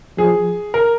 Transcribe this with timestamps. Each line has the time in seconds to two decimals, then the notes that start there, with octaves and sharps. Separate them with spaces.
0.18 F3 G#4
0.74 A#4